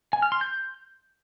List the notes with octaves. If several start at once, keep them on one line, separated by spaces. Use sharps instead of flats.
G#5
F6
C6
G6